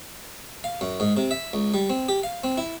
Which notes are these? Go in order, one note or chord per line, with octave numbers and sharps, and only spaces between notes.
F5
F#2
G#2
C3
E5
C#2
G3
C4
G4
F5
C4
E4